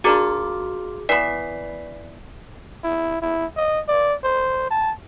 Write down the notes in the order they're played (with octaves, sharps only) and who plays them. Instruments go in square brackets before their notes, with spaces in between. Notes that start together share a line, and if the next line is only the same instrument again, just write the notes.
[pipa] A#3 D4 F4 [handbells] F#4 G#4 D6
[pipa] E3 B3 [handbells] D5 B6 C7
[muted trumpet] E4
E4
D#5
D5
C5
A5